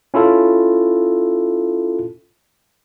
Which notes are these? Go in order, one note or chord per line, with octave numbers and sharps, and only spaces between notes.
C#4 E4 F4 A4